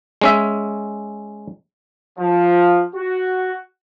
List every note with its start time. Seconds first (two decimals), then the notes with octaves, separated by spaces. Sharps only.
0.21 G#3 C#4 E5
2.19 F3
2.94 F#4